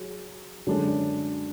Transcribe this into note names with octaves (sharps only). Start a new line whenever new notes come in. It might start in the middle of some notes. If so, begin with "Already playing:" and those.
Already playing: F#3 G#4
F#2 D3 G#3 D4